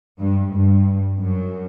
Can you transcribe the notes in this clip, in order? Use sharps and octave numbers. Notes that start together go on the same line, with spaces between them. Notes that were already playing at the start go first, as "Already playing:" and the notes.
G2
G2
F#2